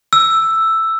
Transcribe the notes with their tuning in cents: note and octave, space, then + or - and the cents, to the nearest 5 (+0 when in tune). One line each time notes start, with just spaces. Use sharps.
E6 +5